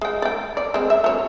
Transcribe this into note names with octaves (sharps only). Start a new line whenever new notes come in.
G#3 G5
D5 G5
D5
G#3 C4
E5
F#3 C#5